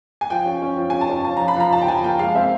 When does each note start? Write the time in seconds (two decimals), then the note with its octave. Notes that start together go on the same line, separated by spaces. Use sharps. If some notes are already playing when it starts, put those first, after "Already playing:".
0.21 G#5
0.30 F3 G5
0.46 C#4
0.62 C#4
0.77 F3
0.90 C#4 G#5
1.01 A5
1.10 C#4
1.25 F3 A5
1.37 F3 A#5
1.48 B5
1.56 F3 A#5
1.72 F3 A5
1.82 G5
1.88 F3 G#5
2.04 A#3 G5
2.19 G#3 F5
2.35 C4 E5